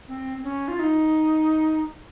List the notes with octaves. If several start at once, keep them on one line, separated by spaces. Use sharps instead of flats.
C4
C#4
F4
D#4